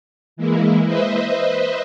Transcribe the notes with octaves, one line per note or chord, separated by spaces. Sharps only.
E3 G#3 A#3 E4
B4 C5 D#5 E5